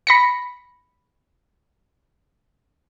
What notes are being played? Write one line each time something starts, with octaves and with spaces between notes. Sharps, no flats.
B5 A#6 C#7